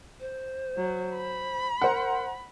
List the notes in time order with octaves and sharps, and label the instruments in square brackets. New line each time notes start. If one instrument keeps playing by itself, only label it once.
[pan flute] C5
[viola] F#3
B5
[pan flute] A#4 [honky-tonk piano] C5 F#5